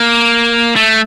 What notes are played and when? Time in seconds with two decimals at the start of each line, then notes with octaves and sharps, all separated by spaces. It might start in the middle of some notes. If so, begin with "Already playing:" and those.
Already playing: A#3
0.76 A3